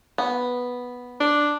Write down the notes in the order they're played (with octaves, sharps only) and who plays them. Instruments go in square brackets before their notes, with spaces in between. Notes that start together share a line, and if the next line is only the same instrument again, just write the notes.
[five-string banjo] B3
[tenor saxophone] D4